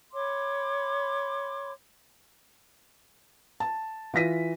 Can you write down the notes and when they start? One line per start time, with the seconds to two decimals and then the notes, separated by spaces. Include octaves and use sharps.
0.14 C#5 B5 C6 D6
3.60 A5
4.14 E3 F4 A#6 B6 D#7